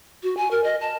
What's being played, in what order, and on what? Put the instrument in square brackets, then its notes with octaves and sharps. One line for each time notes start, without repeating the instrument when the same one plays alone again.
[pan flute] F#4
G#5
A#4
D#5
A5